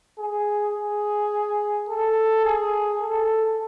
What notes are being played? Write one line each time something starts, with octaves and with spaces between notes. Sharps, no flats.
G#4
G#4
A4
G#4
A4